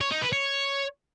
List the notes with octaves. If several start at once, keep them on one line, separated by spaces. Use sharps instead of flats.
C#5
D#4
B4
C#5